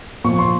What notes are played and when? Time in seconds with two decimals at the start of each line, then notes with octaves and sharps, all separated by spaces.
0.24 A#2 F3 A#3 C#6
0.39 C6